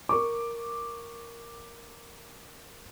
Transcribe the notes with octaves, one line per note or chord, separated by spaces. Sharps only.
A#4 C#6 D6